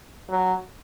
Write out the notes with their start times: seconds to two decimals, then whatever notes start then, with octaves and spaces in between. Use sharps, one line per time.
0.29 F#3